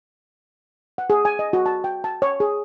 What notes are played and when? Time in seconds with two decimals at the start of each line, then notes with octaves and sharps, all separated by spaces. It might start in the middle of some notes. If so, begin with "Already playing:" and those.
0.98 F#5
1.10 G#4
1.25 G#5
1.39 D#5
1.53 F#4
1.66 A5
1.84 G5
2.04 A5
2.22 C#5
2.40 G#4